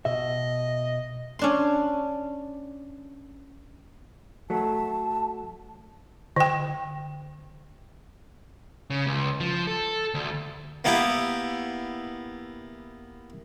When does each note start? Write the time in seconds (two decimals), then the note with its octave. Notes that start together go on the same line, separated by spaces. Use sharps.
0.05 B2 D#5 E5
1.39 C#4 D4 C6
4.50 F#3 A3 A5
6.36 D3 G5
8.90 C#3
9.06 C#2
9.40 F3
9.67 A4
10.14 D2
10.84 A#3 B3 E4 G4